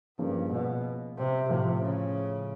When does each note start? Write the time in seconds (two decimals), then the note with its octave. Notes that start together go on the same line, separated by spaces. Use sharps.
0.19 G2 C#3 F3 A#3
0.51 B2
1.17 C3
1.49 A2 C3 F3 A3
1.82 C#3